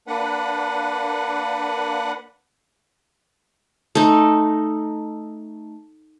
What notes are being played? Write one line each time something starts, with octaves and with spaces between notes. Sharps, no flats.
A#3 D4 B4 F#5
A3 D#4